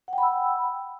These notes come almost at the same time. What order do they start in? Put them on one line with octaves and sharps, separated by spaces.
F#5 G5 B5 E6